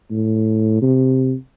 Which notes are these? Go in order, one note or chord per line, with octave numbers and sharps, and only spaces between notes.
A2
C3